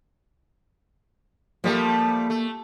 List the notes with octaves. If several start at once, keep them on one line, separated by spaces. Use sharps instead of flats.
F3 G3 A3 A#3
A3